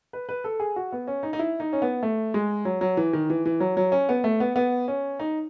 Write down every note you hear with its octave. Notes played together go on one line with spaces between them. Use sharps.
B4
B4
A4
G#4
F#4
B3
C#4
D#4
D#4
E4
D#4
C#4
B3
A3
G#3
F#3
F#3
E3
D#3
E3
E3
F#3
F#3
C#4
B3
A3
B3
B3
C#4
D#4